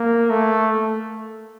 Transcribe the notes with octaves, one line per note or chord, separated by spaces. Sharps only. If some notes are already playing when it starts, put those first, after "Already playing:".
Already playing: A#3
A3